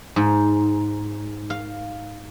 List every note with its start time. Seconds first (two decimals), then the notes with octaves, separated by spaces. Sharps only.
0.16 G#2
1.50 F5